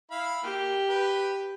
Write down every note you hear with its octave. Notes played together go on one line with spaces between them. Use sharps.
E4 F5 B5
A#3 G4
B4